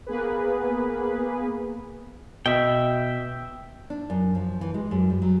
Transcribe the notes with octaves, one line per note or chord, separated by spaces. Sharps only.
A#3 B3 G#4 B4
B2 E5 G5
D4
F#2
F3
E3
G#3
F#2
G3
F#3